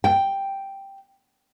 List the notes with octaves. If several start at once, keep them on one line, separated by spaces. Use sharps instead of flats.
G5